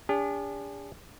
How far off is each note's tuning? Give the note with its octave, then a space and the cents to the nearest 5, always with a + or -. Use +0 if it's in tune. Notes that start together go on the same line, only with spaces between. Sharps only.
D4 -35 G#4 -45